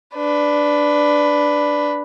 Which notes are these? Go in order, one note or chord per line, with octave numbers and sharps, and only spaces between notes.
D4 B4